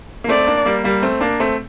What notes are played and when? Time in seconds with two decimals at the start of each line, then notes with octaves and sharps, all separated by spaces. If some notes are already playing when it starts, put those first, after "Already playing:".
0.24 A#3
0.28 A3 C4 D5
0.47 A#3 D4
0.66 G3 A#3
0.84 G3 A#3
1.03 A3 C4
1.21 A#3 D4
1.40 A3 C4